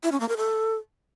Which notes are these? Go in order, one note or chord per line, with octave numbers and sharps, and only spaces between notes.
E4
C#4
A#3
A#4
A4